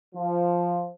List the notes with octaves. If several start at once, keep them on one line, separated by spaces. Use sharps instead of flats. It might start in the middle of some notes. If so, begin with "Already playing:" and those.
F3